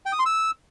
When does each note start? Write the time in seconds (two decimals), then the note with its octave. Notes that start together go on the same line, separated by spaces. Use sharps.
0.06 G5
0.12 D#6
0.19 C6
0.26 E6